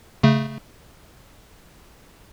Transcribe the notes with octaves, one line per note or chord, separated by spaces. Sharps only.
C#3 A3